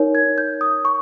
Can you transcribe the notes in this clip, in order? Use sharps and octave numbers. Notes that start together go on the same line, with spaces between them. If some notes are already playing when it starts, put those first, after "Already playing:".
Already playing: D#4 A#4 C#5
G#6
G6
D#6
C#6